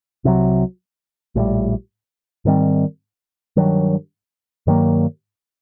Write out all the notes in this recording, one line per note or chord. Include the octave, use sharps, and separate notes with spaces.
C2 C3 D#3 F#3
A#1 A2 E3 G3
G#2 D#3 G3 C4
G2 D#3 F#3
G2 D#3 F#3 A#3